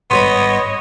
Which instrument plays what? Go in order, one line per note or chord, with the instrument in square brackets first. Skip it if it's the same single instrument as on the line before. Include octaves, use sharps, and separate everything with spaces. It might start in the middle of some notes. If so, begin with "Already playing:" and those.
[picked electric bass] G#1 G2 [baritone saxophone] B3 [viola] C#5 D#5 [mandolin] B5 C6